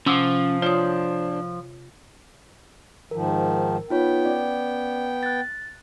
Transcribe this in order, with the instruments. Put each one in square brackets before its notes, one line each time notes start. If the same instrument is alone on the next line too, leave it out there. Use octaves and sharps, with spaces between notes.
[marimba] C3 F#5 D6 [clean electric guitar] F3 [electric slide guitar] C#4
[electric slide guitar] D4 C5 [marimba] F4 C#5 D#6
[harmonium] G#2 D#3 F3 [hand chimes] A#4
[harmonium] B3 G5 [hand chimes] D#4 F4 C#5
[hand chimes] C#4 D5
F#6 A6